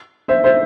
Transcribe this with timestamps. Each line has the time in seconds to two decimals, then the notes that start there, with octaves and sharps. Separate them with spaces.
0.28 C5 E5
0.44 C5 E5